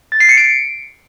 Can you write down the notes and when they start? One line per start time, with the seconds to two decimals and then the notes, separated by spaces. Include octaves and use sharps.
0.12 A6
0.20 C7
0.29 C#7
0.37 D7